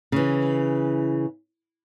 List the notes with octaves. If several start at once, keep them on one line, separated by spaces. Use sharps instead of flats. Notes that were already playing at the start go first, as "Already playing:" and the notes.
C#3 E3